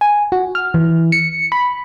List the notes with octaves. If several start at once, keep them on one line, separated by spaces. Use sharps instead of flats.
G#5
F#4
F6
E3
C#7
B5